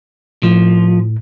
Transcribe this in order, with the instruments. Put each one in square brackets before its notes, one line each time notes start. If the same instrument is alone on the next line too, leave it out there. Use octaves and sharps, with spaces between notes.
[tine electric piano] A2 [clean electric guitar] F3